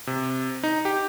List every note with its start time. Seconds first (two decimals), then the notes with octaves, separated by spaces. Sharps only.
0.07 C3
0.63 D#4
0.85 G4